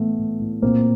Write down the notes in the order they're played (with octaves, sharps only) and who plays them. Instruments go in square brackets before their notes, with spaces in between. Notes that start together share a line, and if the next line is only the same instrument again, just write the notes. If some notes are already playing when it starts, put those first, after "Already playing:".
Already playing: [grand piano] A2 E3 A3 B3
A2
A2
A#2 A#3 C4